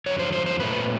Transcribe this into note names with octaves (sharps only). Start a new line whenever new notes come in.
F2 D3 F#3 C#5
C5
C5
C5
A#2 F#3 A3 C4 B4